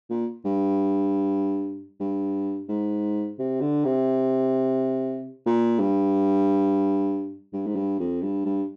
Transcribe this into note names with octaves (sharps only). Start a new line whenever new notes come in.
A#2
G2
G2
G#2
C3
D3
C3
A#2
G2
G2
G#2
G2
F2
G2
G2